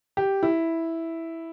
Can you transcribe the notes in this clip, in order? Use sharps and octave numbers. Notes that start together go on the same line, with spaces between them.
G4
E4